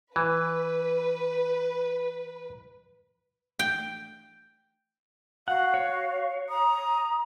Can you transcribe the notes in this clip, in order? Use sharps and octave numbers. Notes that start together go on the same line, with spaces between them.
E3 B4
G5
F#4 F5 F#5
C#5
A#5 D#6